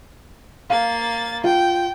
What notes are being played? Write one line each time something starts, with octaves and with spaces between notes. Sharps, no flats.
A#3 F5 A6
F4 G5